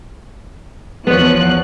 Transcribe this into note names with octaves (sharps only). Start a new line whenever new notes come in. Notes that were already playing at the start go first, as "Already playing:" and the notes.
E2 F3 B3 C#5 F#6